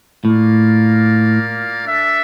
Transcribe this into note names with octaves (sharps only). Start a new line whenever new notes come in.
A2 A#3 F4 A#4 D5 F5
D4 A4 E5